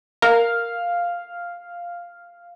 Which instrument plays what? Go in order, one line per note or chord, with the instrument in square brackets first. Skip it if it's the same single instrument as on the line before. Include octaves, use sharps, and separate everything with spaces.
[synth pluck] A#4 [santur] F5